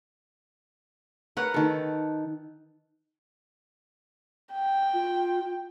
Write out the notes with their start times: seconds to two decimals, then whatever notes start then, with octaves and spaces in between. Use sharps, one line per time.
1.37 A#4 B4 C#5 F#5
1.54 D#3 A4
4.53 G5
4.93 F4